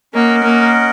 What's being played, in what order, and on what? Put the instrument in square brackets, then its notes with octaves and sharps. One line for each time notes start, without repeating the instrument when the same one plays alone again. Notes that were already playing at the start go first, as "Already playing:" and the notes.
[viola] A#3 [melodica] C#4 A#4 D#5 F#5
[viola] A#3